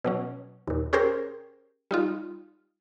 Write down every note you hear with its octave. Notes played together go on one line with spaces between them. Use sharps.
B2 F#3 C#4
D#2 A#2
C#4 G4 G#4 A#4 C5 G5
G3 D#4 F4